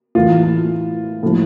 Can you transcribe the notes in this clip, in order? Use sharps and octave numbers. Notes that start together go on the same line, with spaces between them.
A2 E3 F4
A2 F3